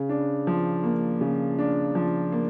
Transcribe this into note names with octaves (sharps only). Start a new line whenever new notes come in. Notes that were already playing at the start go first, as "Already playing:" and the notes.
Already playing: C#3
D4
F3
A#3
C#3
D4
F3
A#3